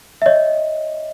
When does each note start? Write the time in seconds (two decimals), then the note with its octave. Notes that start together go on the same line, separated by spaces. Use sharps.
0.22 E5
0.26 C#5 D#5